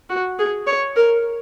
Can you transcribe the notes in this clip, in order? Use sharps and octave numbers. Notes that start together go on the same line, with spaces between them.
F#4
G#4
C#5
A#4